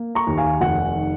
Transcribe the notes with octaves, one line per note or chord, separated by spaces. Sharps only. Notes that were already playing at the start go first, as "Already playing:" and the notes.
Already playing: A#3
A#5 C#6
D#2
F5 G#5
F1 F#5
D#3